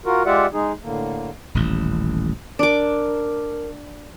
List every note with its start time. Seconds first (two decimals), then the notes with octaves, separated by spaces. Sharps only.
0.06 F4 F#4 A#4
0.26 G#3 F4 G4 D5 E5 F#5
0.53 G#3 D#4 G#4
0.83 A2 D3 A#3
1.55 D#1 A1
2.59 D4 A#4 D6